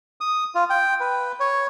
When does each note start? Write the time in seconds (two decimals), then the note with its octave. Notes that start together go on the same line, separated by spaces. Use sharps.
0.21 D#6
0.55 F4
0.70 G5
1.00 B4
1.40 C#5